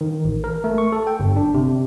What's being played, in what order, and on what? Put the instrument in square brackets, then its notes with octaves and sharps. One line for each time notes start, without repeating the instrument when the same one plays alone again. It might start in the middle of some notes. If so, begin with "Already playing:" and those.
[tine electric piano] D#3
A1
A#4
A3
C#6
A4
G5
G1
D4
C3